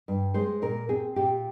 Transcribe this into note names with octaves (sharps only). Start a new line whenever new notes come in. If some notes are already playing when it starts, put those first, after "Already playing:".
G2
G#3 C5
A#2 A#4
C4 G#4
A#2 G4